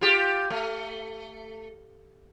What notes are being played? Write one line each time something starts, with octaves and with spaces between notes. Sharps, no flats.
F4 G4
A3